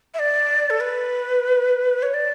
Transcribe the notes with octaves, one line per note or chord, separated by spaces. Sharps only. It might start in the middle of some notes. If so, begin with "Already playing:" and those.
E5
D5
A4
B4
C#5
D5